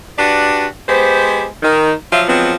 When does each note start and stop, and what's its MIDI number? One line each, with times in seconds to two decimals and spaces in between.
0.18 0.65 62
0.18 0.65 66
0.18 0.65 67
0.18 0.65 71
0.18 0.65 74
0.88 1.45 56
0.88 1.45 59
0.88 1.45 67
0.88 1.45 72
1.63 1.92 51
2.11 2.22 53
2.11 2.22 54
2.11 2.22 65
2.11 2.22 76
2.11 2.22 77
2.28 2.53 53
2.28 2.53 54
2.28 2.53 56
2.28 2.53 59
2.28 2.53 60